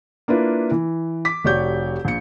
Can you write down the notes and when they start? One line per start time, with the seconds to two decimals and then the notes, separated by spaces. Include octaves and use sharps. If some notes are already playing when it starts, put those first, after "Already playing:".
0.28 A#3 D4 E4 F4 B4
0.71 E3
1.25 D6 B6
1.44 F1 F#4 G4 C#5 D5 G6
2.05 A#1 C#7